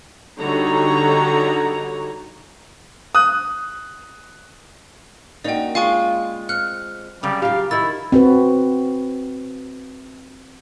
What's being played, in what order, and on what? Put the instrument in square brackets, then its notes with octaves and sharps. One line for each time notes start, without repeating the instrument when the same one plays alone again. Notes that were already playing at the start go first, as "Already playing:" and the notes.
[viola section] D3 G3 D#4 F#4 C#5 A#5
[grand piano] D#6 F#6
[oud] A#3 C#4 [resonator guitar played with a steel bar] D#4 F#4 [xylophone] D5 D#5 G5
[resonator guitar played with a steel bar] G#3 F4 [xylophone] F5 G#5 C#6
[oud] C4 [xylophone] F6 F#6 C#7
[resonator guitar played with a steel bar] F#2 C#3 [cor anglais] G3
[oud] F4 G4 [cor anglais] F5
[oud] D#3 D#4 [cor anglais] E4 [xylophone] E6 A6
[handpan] C4 F#4 B4